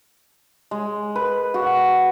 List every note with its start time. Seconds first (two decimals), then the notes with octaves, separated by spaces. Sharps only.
0.71 G#3
1.16 B4
1.54 F#4